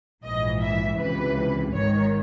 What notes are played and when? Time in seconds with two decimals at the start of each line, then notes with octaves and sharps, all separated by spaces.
0.23 A#1 G#2 E3 D#5
0.61 E5
0.99 C#2 C3 E3 B4
1.74 G#1 G#2 D#3 C#5